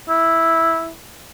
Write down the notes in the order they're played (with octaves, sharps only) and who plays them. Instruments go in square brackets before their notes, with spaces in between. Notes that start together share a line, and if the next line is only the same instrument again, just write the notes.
[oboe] E4